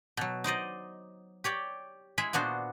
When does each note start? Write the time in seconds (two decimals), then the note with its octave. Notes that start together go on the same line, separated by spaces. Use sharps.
0.17 B2 F#3
0.44 D#4 C5 D5 D#5
1.44 G4 C#5 D5 G5
2.18 G#3 E4 G#4 E5 B5
2.33 A#2 B3 D4 F#4 C5